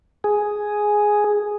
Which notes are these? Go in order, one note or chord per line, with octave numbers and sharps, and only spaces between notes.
G#4